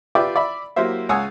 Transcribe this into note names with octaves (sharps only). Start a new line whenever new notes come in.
F4 G4 B4 D5 E5 G5
D5 E5 B5
F#3 A#3 E4 G4 C5 E5
C#2 C#5 F#5 G#5 D#6 E6